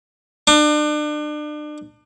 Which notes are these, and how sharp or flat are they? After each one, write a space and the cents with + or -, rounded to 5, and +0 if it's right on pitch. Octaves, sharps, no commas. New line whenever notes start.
D4 +35